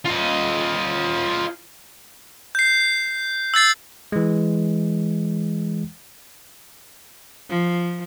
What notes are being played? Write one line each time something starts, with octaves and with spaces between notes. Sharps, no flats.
F4 D#5
G6 C7
E6 G6 A6 C7
E3 G#3
F3